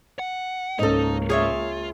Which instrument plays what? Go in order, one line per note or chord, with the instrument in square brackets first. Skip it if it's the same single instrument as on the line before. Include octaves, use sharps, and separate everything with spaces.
[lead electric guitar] F#5
[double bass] C#2 A#3 [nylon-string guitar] G#2 C#4 [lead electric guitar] D#4 [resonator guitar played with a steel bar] A4 D#5
[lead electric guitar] F4 [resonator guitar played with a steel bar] G#4 C#5 E5